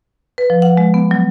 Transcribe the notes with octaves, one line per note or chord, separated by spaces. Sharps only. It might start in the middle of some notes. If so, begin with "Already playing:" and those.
B4
F3
F#5
G#3
B3
F#3